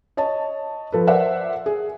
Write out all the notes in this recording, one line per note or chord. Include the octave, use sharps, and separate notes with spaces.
C#5 D#5 A5
F3 A4 B4
A#4 C5 D5 E5 F#5
G#4